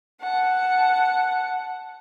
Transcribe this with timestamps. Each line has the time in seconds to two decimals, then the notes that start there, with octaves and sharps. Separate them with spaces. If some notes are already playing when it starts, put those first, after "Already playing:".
0.21 F#5 A5